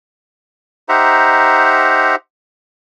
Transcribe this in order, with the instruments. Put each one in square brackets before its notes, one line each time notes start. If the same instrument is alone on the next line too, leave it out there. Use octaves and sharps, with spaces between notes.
[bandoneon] D#4 G4 C5 E5 F#5 A#5